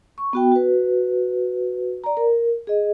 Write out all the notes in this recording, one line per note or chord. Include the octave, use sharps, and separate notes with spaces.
C#6
B3 F#4 G5
F#4 B4
D5 A#5
A#4
G#4 D#5